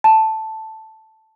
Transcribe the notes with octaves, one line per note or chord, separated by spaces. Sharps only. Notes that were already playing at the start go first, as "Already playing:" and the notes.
A5